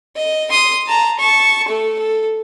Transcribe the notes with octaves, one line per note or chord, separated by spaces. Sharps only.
D#5
C6 D#6
A5 A#5
A5 C#6
A3 A4
A4